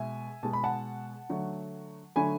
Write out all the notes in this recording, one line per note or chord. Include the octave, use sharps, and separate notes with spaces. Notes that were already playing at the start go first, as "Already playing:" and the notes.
Already playing: B2 G#3 E5 G#5
B2 G#3 A5
B5
F#5 A5
D3 F#3 A3
D3 F#3 A3 G#5 B5